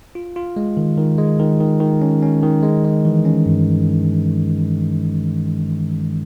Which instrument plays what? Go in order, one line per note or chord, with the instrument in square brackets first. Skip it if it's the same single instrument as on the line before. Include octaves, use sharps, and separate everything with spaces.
[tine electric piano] F4
F4
G#3
D#3
D#3
G#3
D#3
D#3
D#3
C#4
C#4
D#3
G#3
G#3
E3
C#4
G2